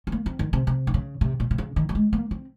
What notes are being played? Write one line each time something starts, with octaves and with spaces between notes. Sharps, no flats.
C4
A#3
C4
D#3
C3
C3
D#3
C#3
C3
A#2
C3
C#3
D#3
F#3
G#3
A#3
C4